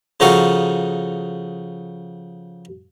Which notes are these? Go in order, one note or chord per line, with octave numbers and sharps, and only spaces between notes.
C#3 F3 D#4 F#4 A4 F5